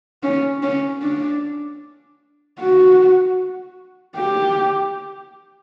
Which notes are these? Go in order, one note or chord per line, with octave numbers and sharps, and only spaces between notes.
C#4
C#4
D4
F#4
G4